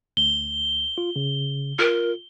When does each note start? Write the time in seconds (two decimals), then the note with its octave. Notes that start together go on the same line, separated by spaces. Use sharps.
0.17 D2 G7
0.98 F4
1.16 C#3
1.79 F4 A#4